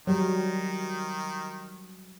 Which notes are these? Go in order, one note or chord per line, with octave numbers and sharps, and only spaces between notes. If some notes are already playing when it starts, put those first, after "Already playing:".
D#3 F#3 G3